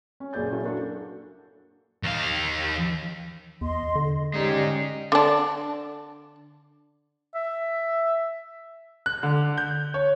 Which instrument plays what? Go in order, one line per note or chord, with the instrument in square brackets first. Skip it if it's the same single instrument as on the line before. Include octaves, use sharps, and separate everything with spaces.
[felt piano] C#4
F#1 A#2 G#4 D5 G6 A6
A#3 C#4 E4 F#4 G#4
A#3 D4 F#4 A4
[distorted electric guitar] D#2 F5
[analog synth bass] E2 [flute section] D#5 C6
[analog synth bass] D3
[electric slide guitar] G#3 D#4 [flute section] C#4 G4 D5
[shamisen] D3 D4
[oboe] E5
[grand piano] F#6
D3
G6
C#5